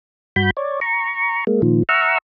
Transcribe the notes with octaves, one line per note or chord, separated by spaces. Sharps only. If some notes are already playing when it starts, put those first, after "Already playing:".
G2 F#4 B5 G6
C#5 D5
A#5 C#6
G#3 A#3
A#2 D#3 F3
E5 F#5 A#5 C#6 E6 F6